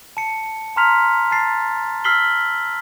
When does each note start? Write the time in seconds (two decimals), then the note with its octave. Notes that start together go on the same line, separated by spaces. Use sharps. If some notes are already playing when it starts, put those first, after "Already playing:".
0.17 A5 C#7
0.76 A5 A#5 C6 F6 B6 F7
1.31 A5 A6 C7
2.04 E6 F6 B6 C7 F#7 G7